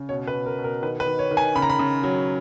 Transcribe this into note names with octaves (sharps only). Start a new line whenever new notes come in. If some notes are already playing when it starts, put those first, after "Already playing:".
Already playing: C#3
B2 C#5
B4
B2
A#4
B2
A#4
D#3 B4
B4
D#3
C#5
D#3
G#5
C#3 B5
A#5
B5
C#3
F#3